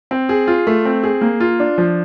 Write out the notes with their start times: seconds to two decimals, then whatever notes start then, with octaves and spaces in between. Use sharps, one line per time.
0.11 C4
0.29 G#4
0.48 F4
0.67 A3
0.85 C4
1.03 G#4
1.21 A#3
1.40 F4
1.60 D4
1.78 F3